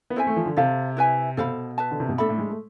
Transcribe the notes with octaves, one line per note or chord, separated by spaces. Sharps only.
B3
C4 E4 A4 E5 G#5
A3
F3
D3
C3 A4 C5 F5 A5
E4 B4 E5 G#5
B2 A4 C5 F5 B5
B4 E5 A5
D3
C3
B2
A2 D4 A4 E5 B5
A2
G#3
A3